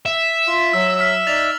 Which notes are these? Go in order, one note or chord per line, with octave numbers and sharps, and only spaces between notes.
E5
F4
F#3 E6
E6 F6 B6
D#4 D5 A6 F7